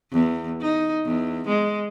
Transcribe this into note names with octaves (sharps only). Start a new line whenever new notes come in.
E2
D#4
E2
G#3